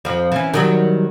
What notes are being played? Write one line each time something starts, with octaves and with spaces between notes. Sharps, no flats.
F2 F3
E3 C#4
D#3 F#3 G3